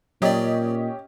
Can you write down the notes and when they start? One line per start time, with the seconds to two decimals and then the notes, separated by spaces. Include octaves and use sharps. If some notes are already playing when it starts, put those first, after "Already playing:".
0.22 A#2 F#3 C#4 G4 D5 D#5